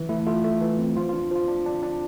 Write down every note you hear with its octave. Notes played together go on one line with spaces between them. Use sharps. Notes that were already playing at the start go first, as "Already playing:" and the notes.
Already playing: E3
A3 E4
A3 F4
A3
E3
C4
F3 F4
F4
D4
F3 F4
D4
D4
D4